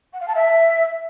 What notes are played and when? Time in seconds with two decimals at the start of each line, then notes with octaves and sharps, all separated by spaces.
0.13 F#5
0.20 F5
0.28 A5
0.35 E5